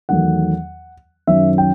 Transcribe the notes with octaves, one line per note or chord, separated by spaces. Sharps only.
E2 D#3 F#3 A3 F#5
F#2 D#3 F#3 E5
G5